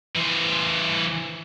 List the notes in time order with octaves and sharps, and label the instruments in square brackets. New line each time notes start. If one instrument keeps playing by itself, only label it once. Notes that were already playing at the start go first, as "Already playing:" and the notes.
[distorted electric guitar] E3 C5